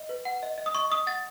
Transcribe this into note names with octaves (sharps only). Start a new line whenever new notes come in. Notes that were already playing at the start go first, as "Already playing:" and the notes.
Already playing: D#5
B4
F#5
D#5
D#5
D#6
D#5 C#6
D#5 D#6
F#5 A6